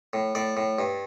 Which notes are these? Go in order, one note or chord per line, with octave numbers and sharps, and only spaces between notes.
A2
A2 D5
A2
G2